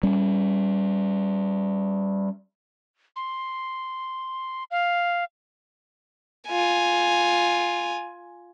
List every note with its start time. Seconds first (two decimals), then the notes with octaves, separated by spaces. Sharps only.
0.03 G3 C#4
3.16 C6
4.71 F5
6.48 F4 G#5